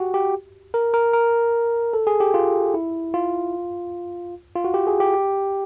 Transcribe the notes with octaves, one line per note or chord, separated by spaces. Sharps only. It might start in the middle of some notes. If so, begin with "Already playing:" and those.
Already playing: F#4 G4
G4
A#4
A#4
A#4
A4
G#4
G4
F4
E4
F4
F4
F#4
G4
G#4
G4
G4